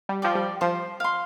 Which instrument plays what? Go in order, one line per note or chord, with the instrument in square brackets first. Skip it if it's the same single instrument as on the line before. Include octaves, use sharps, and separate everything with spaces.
[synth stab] G3
[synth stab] F3 [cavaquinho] D5 G5
[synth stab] G3
[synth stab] F3 [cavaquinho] C5
[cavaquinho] F5 C6